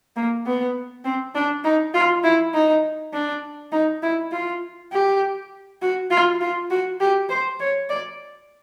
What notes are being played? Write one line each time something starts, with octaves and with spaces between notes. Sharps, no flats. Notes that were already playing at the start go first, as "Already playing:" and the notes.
A#3
B3
C4
D4
D#4
F4
E4
D#4
D4
D#4
E4
F4
G4
F#4
F4
F4
F#4
G4
C5
C#5
D5